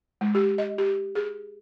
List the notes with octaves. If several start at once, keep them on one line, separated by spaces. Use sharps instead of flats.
G#3
G4
D#5
G4
G#4